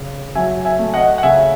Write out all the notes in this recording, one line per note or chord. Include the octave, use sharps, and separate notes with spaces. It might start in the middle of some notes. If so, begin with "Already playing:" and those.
Already playing: C#3
F#3 E5 G#5
E5 G#5
A3
D#5 F#5
F#5
C#3 E5 G#5